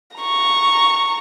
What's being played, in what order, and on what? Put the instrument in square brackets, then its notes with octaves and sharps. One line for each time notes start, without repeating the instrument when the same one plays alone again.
[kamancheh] A#5 C#6